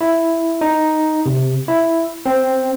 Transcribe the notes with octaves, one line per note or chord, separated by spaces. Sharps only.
E4
D#4
C3
E4
C4